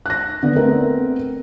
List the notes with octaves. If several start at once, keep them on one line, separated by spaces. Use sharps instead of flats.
F#6 A#6
D3 B3
A3 B3 C4 A#4